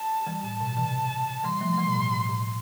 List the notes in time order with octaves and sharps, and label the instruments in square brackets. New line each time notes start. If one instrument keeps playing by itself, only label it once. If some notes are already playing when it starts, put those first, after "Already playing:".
Already playing: [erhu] A5
[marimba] E3 G3
[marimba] A2 [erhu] A5
[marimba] B2
C3 E3
[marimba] E3 G3 [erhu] C6
[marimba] F3 A3
A3
E3 G3
B2
A2
A2
A2